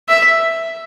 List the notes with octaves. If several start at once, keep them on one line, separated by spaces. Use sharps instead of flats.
E5